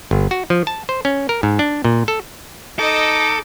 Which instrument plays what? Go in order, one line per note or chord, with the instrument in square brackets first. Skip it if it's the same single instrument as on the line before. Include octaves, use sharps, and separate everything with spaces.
[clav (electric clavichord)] G1
F#4
F3
A5
C5
C#4
A#4
G#2
D4
A#2
A4
[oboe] D#4 [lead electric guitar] A4 [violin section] D#5 E6 [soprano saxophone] D6